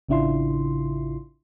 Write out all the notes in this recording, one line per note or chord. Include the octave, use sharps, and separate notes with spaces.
A1 C#3 D4 E4 F4 C6